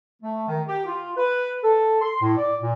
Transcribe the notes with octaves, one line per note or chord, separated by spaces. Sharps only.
A3
D#3
G4
F4
B4
A4
C6
A2
D5
A#2